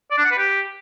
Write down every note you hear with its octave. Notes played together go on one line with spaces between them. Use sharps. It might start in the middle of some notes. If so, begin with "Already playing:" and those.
D5
D4
F#5
B4
G4